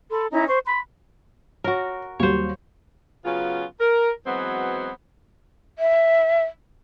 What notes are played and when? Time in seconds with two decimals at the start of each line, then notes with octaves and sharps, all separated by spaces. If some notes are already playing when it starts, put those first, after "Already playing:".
0.11 A4 B5 C6
0.31 C#4 D#4 E4 A#5
0.48 C5 C#6
0.65 B5 C6
1.64 F#4 A#4 C#5
2.19 D#2 F#3 G3 C5 C#5
3.25 C#3 F#3 B3 C#4 F4
3.81 A#4
4.27 E3 F#3 G#3 B3 C4 F#4
5.79 E5